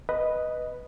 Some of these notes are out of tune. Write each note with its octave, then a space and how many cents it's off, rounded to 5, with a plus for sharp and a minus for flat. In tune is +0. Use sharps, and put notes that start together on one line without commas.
B4 +0 D#5 +0